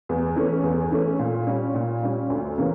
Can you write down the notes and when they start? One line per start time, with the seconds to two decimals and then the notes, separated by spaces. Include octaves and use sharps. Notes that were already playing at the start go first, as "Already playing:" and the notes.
0.09 E2
0.36 E3 A3 C#4
0.64 E2
0.91 E3 A3 C#4
1.19 A#2
1.47 G3 C#4
1.74 A#2
2.02 G3 C#4
2.30 D2
2.58 C#3 E3 A#3 C#4